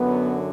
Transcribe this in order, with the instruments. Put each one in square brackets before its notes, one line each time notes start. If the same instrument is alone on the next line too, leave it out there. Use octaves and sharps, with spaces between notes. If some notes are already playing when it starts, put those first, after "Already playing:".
Already playing: [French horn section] F#2 D3 F#3 B3